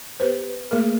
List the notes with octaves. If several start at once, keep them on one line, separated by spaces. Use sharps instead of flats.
B3 G4 B4 C5
A3 A#3 G#4 A#4